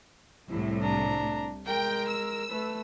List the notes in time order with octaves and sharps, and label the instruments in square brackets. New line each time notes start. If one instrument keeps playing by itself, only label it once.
[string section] C2 A2 [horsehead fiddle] E4
[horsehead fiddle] D4 A#5
[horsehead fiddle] G#3 A#4 [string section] G5
[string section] E6
[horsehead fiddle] A3 B4